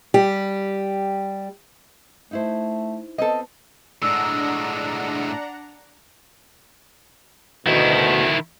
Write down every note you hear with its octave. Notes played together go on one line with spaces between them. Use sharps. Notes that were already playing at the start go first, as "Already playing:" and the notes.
G3 G4
A3 D#4 E4 C5
B3 C4 A4 D#5
A2 G#3 D4 F#5 A#5 E6
D2 B2 D#3 E4